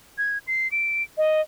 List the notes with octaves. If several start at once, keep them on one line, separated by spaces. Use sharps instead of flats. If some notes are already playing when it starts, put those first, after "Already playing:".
G#6
C7
D7
D#5